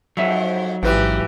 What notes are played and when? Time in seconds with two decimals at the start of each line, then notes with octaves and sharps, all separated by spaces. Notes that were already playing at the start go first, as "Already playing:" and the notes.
0.17 F2 G#2 F#3 E5
0.83 A1 G#2 E3 F3 G4 B4